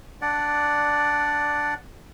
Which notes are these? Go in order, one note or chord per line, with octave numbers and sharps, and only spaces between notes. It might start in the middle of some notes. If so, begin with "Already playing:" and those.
D4 D5 F#5